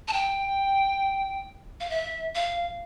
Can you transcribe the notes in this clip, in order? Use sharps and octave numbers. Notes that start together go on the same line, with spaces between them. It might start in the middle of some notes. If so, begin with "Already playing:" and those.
A5
G5
F5
E5
F5